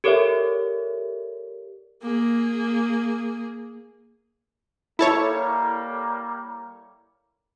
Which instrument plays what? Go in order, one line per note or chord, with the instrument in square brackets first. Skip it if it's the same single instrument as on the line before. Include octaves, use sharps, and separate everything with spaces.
[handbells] G4 A4 A#4 C#5 D5 E5
[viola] A#3 G#4
[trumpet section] G3 A#3 [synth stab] E4 A4 C#5